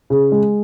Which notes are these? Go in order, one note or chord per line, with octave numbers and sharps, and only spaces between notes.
C#3
G#3